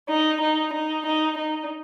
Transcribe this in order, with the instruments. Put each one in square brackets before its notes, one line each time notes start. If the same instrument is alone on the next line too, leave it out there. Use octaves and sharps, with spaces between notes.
[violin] D#4
D#4
D#4
D#4
D#4